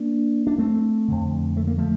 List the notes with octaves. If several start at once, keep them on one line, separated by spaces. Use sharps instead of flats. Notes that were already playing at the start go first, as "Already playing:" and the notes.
Already playing: A#3 D4
D4
A3 C4
F2 D3
A3
A#3
F3 A3